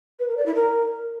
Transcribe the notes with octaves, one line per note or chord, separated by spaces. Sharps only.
B4
A#4
D5
E4
A#4